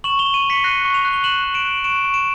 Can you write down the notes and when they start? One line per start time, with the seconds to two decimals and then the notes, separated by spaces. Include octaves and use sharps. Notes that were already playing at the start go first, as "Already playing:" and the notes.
0.04 C#6 E7 F#7
0.19 F7 G7
0.25 C#6
0.34 D#7 F7
0.44 C#6
0.50 B6 C#7
0.64 F#6 A#6 C7
0.85 C#6
0.94 D#7 F7
1.05 F#6
1.13 G7
1.24 F#6 E7 F#7
1.44 F#6
1.54 D7 E7
1.65 F#6
1.84 C#6 D7 E7
2.04 C#6
2.14 D7 E7